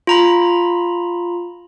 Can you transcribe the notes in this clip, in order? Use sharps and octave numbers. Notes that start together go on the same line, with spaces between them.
F4 A#5 B5